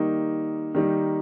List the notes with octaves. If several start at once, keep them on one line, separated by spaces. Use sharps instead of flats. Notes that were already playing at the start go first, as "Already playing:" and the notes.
Already playing: D#3 G3 A#3 D#4
D#3 G3 A#3 D#4